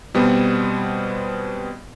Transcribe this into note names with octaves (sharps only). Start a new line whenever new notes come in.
B2 G3 B3 C4